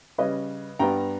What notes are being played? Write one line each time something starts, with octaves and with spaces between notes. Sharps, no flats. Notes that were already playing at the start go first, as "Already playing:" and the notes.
C#3 G3 C#4 B4 D#5
G2 G3 B3 G5 A#5